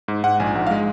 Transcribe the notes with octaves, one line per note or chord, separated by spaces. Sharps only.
G#2
G#2 F#5
A#1 G#5
G#2 F#5
G#3 F5